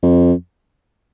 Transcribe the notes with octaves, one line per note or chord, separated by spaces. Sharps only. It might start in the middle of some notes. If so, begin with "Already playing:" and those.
F2